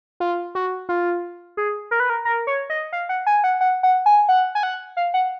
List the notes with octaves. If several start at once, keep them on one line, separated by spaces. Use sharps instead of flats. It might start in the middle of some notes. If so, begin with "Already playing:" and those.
F4
F#4
F4
G#4
A#4
B4
A#4
A#4
C#5
D#5
F5
F#5
G#5
F#5
F#5
F#5
G#5
F#5
G#5
F#5
F5
F#5